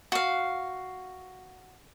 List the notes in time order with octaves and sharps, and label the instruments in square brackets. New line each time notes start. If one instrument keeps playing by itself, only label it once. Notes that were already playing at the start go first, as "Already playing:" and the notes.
[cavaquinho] F#4 F5